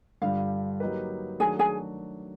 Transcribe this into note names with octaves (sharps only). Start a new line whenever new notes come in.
G2 D3 G3 F4 F5
F#3 A#3 D#4 G4 B4
D#3 F#3 A3 D4 F#4 G#4 G#5
G#4 G#5